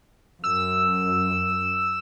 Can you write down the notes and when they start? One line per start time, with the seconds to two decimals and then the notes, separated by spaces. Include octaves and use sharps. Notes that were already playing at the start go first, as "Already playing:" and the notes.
0.44 F#2 E6